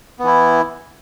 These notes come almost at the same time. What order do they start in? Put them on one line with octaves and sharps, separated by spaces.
B3 E3 E4